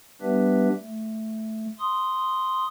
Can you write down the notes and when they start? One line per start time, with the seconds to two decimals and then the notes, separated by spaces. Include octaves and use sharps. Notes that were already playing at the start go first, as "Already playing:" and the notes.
0.22 G3 B3 D4 G4 B4 E5
0.80 A3
1.79 C6 D#6